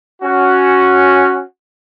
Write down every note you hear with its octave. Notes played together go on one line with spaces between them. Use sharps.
C#4 F#4